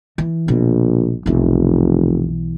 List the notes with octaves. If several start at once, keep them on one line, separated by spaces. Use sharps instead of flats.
E3
A#1 B2
F1 B1 E3